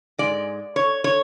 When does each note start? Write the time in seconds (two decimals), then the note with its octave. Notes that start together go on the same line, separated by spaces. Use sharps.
0.18 G#2 G#3 D5
0.76 C#5
1.04 C#5